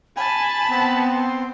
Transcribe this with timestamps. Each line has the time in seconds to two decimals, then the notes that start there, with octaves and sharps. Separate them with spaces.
0.17 G#5 A5 B5
0.71 B3 C4
1.11 C6